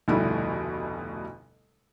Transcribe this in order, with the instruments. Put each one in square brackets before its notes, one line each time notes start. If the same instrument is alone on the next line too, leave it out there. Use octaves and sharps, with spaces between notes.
[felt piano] F1 D2 B2 G3 E4